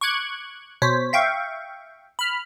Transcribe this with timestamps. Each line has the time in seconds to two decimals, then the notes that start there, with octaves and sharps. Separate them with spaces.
0.01 C#6 D6 F#6 G#6
0.82 B2 C5 C#5 B6
1.13 E5 F5 G5 C#6
2.19 B5 F6